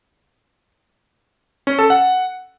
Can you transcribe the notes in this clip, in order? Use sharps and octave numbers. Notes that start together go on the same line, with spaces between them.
C#4
A4
F#5